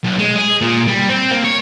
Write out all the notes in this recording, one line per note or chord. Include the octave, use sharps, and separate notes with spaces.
B1
G#3
G#4
A#2
G3
C4
A#3
C#5